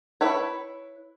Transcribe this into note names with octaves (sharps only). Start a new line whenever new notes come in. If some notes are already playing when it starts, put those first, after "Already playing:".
E4 B4 C#5